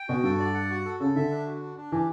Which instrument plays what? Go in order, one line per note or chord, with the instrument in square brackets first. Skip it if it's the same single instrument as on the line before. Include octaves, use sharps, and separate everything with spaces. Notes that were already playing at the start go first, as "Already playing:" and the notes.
Already playing: [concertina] G5
[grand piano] B2 [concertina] F#4
[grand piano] G2 [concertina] A4
[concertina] D5
F#5
F#4
A4
[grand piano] C#3 [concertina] A4
[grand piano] D3 [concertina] E5
[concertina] D4
F#4
D4
D4
[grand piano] E3 [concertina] G4